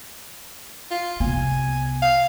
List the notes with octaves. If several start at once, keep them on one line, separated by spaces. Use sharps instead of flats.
F4
C2 B3 G#5
F5